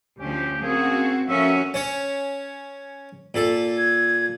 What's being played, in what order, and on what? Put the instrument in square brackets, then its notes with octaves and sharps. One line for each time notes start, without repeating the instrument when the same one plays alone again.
[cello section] D2 F3 [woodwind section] C#4 G4
[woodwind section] A#3 C#4 G#4 [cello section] C4 F#4
[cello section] F3 C#4 F#4 [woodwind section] A#3 A4 E5
[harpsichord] C#4 C#5
A#2 A4
[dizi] G#6